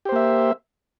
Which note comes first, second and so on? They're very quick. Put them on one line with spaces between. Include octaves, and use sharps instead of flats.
G4 C5 A#3 E5